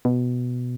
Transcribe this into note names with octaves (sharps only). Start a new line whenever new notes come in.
B2